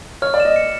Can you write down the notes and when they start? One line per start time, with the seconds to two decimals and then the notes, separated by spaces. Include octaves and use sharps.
0.22 C#5 F6
0.34 D5
0.40 E7
0.45 D#5
0.56 C#7